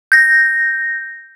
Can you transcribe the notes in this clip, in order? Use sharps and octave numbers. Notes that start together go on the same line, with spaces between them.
G6 A#6